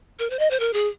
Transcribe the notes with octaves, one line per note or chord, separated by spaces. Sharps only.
A#4
C5
D#5
C5
A#4
G#4